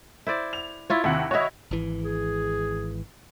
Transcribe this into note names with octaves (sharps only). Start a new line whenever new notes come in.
E4 C5 D5
F7
E4 F4 C#5
D#2 C3 E4 F#5
E4 F#4 C#5 D#5
G#1 E3
G#4